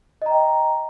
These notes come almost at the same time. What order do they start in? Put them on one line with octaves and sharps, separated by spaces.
D#5 A#5 G5